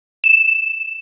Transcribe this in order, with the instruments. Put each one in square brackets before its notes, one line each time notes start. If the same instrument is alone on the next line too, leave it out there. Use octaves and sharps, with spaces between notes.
[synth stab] E7